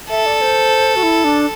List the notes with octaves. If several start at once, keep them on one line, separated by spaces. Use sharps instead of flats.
A4 E5
D5
C5
F#4
E4
D4